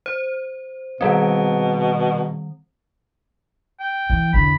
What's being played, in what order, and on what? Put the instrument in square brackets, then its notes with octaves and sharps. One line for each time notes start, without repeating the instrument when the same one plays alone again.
[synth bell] C5
[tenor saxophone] B2 [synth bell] D#3 G3 C4
[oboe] G5
[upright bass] E3
[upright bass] E2 D3 [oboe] B5